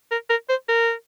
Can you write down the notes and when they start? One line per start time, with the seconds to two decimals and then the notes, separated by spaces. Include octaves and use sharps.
0.11 A#4
0.30 A#4
0.49 C5
0.69 A#4